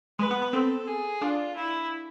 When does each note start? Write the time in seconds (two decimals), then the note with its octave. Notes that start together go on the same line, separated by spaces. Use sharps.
0.19 G#3 B4
0.31 B3
0.42 B3
0.53 C4 A4
0.87 G#4
1.21 D4 F4
1.56 E4